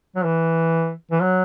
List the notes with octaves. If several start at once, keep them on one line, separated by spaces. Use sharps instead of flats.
F#3
E3
E3
F#3